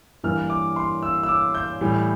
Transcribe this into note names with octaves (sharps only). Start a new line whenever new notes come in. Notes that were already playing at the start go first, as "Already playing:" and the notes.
G2 E3 A#3 F6
D6
C6
E6
E6
D6
G6
A2 E3 G3